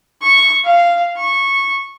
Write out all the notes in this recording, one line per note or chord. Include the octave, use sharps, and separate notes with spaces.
C#6
F5
C#6